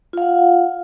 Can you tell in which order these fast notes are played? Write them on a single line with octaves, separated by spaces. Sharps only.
F4 F5 F#5